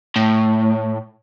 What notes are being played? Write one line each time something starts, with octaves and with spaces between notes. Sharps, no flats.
A2